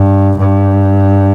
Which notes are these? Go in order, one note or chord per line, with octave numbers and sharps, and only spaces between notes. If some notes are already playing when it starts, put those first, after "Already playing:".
Already playing: G2
G2